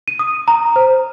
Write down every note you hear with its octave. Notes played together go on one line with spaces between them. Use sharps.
D#7
D#6
A#5
C5